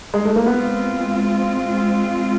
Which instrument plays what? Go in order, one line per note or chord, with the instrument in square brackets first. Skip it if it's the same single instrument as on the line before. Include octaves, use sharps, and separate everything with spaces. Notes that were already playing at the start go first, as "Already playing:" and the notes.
[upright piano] G#3
A3
A#3
[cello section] G#3 C4 F4 [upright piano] B3